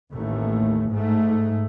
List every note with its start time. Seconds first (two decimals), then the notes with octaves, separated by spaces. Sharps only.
0.12 A1 D#2 A3
0.89 G#2 A3